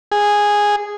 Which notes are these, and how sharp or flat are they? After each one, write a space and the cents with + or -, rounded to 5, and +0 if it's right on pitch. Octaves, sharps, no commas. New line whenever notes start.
G#4 -10